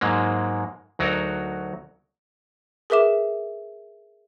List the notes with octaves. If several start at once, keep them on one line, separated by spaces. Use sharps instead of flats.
G#2 F#3 G#3 A#3
D2 F#3 D#4 F#4 A#4
G#4 A#4 B4 E5 D6 E7